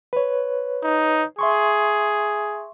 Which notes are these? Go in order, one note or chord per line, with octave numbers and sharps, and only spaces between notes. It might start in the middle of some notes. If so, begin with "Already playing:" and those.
B4 C#5
D#4
G#4 E5 C6 C#6